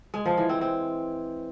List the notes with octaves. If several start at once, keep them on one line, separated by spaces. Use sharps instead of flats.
G#3
F3
E3
C4
C4